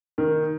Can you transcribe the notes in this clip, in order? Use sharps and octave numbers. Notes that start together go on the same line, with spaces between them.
D#3